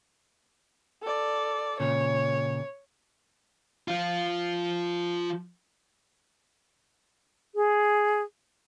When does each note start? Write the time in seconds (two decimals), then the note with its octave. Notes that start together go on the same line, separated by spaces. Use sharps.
1.02 A4 D5
1.80 A#2 C#3 C#5
3.88 F3 F4
7.55 G#4